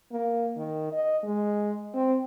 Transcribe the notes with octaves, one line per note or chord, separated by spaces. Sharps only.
A#3
D#3
D#5
G#3
C4